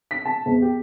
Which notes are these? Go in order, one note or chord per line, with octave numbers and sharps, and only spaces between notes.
B6
A5
E1
G4